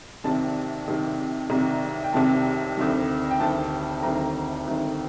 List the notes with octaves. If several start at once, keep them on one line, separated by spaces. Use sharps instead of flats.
C2 C3 D#3 A5
C2 C3 D#3
C2 C3 D#3 A#5
G5
C2 C3 D#3 A5
D2 C3 D#3
G5
D2 C3 D#3 A5
D2 C3 D#3 A#5
D2 C3 D#3